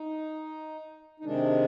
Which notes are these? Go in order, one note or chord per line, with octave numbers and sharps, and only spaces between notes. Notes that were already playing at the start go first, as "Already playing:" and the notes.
Already playing: D#4
D#4
C3 D#3 G#3 D4